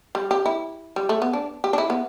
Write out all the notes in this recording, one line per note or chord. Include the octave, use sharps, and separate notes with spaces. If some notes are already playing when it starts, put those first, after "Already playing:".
G3
G4
E4
G3
A3
B3
D4
G4
D4
E4
B3